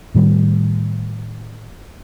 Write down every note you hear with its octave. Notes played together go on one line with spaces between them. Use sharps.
A2 D#3 G3